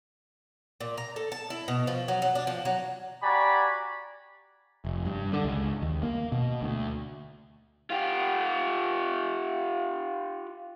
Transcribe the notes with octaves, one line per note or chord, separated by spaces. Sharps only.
A#2
A#5
A4
A5
E4
B2
F3
F#3
F#3
D4
F3
F#3
F#4 G4 D5 G#5 A#5 B5
F1
G2
D3
C#2
D#2
A#3
B2
D2
F4 G4